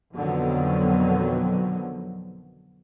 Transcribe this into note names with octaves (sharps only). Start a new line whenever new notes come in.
F2 B2 D3 D#3 F#3